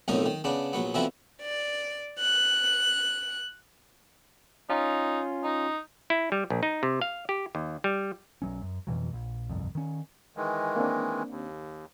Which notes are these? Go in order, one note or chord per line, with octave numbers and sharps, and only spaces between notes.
B1 F2 A2 D3 D#4 A#4
D#3
C#3 B3 D4
A#1 F#3 B3
B2 D3 E3 F3 C4 E4
D5
F#6
C#4 D#4 F4
D#4
E4
G3
A#1
D#4
C3
F5
G4
D#2
G3
B1 F#3 C#4
F#2
F2 B2 E3 F#3
A#1
G1 C2 F2
D#3 C#4
D#3 E3 G#3
A#3 C4 D4
D#2